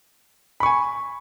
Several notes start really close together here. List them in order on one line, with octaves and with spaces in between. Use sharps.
B5 C#6 G#5